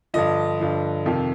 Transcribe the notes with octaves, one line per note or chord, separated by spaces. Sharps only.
G2 D3 F3 D#5
G2 D3 F3
F2 C3 D#3